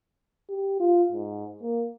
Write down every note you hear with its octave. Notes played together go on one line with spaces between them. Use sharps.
G4
F4
G#2
A#3